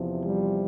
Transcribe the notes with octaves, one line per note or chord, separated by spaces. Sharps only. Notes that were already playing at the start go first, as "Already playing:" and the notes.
Already playing: E2 C3 F3
G3